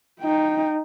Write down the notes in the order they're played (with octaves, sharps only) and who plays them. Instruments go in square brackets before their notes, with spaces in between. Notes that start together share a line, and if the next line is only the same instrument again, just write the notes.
[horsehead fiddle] D#4 G5